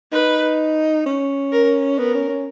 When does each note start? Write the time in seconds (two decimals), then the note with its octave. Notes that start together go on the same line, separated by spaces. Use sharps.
0.12 D#4 B4
1.06 C#4
1.52 A#4
1.98 B3 A#4
2.14 C#4
2.28 C#4